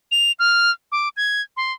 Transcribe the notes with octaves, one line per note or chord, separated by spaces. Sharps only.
F7
F6
D6
G#6
C6